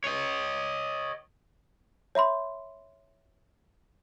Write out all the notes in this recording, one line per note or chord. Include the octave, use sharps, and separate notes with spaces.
C#5 D#5
C#5 E5 B5 C6